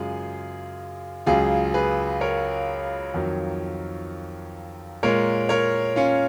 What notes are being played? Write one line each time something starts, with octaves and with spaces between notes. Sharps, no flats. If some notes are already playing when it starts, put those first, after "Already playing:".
Already playing: F#2 C#3 G#3 F4 G#4
C#2 C#3 F#3 F4 G#4
G#4 B4
A#4 C#5
F2 D#3 F#3
A#2 G#3 A#4 C#5
A#4 C#5
C#4 F4